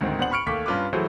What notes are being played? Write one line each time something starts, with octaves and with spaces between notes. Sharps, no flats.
D2 G#2 D#3 C4
D1 B3 D4 C5 F#5 F#7
B5 C#6 F6 C#7 D7
D#2 A3 C#6 D6 B6
G2 C#4 F4 B4 D6
E3 F#3 A3 E4 G#4 C5